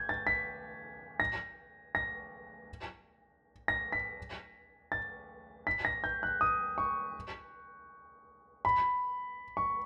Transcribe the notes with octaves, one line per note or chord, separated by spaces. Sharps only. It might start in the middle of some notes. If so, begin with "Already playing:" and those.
Already playing: G6 G#6
A6
B6
A#6
A#6
A#6
B6
A6
B6
A#6
G6
F#6
D#6
C#6
B5
C#6